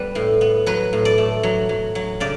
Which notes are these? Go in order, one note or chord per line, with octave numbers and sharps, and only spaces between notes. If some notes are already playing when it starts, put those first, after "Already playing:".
Already playing: G3 B3 B4
A2
B3
F#3 B4
A2
D5
A3
F#3
F#3
F#3
C#3 D5